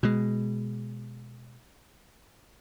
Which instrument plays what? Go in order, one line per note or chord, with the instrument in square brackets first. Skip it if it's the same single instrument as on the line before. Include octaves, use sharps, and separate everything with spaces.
[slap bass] B2 G#3